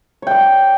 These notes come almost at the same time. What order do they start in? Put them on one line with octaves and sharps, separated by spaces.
C#5 G5 D5